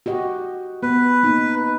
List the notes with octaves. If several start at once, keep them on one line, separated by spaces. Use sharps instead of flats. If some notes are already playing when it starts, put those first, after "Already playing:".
F#4 G4 D#5
B3 B4
A#3 D#4